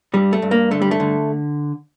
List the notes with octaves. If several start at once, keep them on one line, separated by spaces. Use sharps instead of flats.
G2 G3
A3
G2
A#3
D3 A3
G3
A3
D3